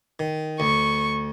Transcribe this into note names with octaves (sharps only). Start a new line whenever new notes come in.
D#3
D2 C#6